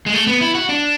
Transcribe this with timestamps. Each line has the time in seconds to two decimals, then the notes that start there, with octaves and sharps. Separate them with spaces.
0.06 G#3
0.14 A3
0.27 B3
0.41 E4
0.55 F#4
0.69 D4